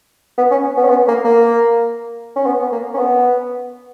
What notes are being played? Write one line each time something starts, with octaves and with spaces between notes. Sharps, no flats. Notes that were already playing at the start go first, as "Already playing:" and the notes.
B3
C#4
B3
C#4
B3
A#3
A#3
C#4
B3
B3
A#3
C#4
B3